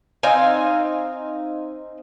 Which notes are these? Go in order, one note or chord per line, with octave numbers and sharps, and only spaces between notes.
C4 D#4 F5 G#5